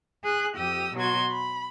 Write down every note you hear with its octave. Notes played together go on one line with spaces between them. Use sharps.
G#4 F#6
F2 G4 D#6 E6
B2 F#3 F#4 C6 G#6
B5